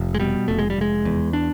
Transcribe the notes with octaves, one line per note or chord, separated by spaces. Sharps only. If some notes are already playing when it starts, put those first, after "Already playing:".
Already playing: F1
G#3
B2 G3
F1 A3
G#3
G3
F1 G#3
E2
D4